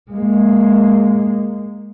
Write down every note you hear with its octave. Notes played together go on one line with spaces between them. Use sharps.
G#3 A#3